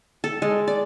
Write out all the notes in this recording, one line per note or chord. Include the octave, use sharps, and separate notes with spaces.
A4
G#3
D5